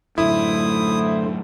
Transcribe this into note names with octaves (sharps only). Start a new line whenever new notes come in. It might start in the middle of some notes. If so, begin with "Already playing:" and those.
F#2 A2 D3 A3 E4 C5 D#6